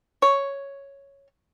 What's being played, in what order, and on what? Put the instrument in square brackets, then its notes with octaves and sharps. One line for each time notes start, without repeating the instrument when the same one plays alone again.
[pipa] C#5